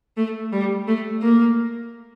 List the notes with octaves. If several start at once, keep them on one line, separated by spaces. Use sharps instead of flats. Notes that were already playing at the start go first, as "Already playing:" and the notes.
A3
G3
A3
A#3